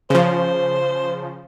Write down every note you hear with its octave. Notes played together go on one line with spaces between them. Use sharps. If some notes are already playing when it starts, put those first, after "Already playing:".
C#3 F3 C5